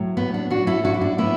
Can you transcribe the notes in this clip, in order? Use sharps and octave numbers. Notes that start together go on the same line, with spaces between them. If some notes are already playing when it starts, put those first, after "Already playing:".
Already playing: A2 F#3
B3
D4
D4 F#4
E4 A4
D4 F#4
E4
D4
A2 A3 B3 E4